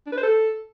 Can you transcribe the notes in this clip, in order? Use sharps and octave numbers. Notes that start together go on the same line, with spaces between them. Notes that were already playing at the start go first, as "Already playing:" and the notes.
D4
B4
C5
A4